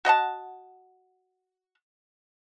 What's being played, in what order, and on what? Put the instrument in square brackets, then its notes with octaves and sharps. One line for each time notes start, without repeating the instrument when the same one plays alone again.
[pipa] F#4 D#5 F#5 A5